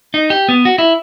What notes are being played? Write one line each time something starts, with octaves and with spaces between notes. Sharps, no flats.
D#4
G4
B3
F#4
E4